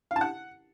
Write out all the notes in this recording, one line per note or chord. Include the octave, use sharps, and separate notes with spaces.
F5
A5
F#5